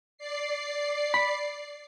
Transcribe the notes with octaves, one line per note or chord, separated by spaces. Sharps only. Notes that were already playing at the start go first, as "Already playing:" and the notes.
D5 C7
B5